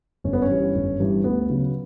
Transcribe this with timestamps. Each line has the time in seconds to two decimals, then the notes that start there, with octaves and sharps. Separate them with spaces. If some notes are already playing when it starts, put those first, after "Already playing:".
0.24 G1 C#4
0.33 B3
0.42 C#4
0.50 G2 E3 G3
0.75 G1
0.99 G2 E3 G3
1.24 D2 B3
1.49 C#3 F#3